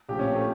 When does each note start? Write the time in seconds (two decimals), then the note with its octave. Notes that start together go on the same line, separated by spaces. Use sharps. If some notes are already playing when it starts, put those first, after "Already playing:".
0.09 A#1 A2 F3 G4
0.19 C#4
0.30 C4
0.35 A3